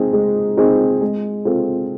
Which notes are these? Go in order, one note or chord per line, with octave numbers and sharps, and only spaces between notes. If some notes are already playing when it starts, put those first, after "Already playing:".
Already playing: G#3 C4 D#4 G#4
G#3
C4 D#4 G#4
G#3
C4 F4 A4